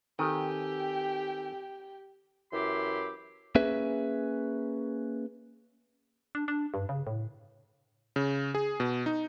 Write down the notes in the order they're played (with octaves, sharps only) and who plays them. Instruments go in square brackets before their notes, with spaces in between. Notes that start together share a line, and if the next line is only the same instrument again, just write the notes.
[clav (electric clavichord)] D#3 [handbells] C4 A4 G#5 [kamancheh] G4 G5
[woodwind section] F#2 E3 E4 G4 C6 D6
[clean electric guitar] A#3 C#4 G#4 B4 E5
[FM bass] D4
D4
G2
C#3
A2
[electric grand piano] C#3
G#4
B2
D#4